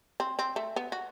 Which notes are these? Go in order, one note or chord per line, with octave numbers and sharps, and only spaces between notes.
C4
C4
A3
B3
F#4